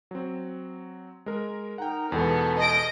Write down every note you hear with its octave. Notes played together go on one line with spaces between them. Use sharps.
F#3 C4
G#3 A#4
D#4 A#4 F#5 G5 A#5
E2 G#2 B2 B3 A4
D#5 A#6 D7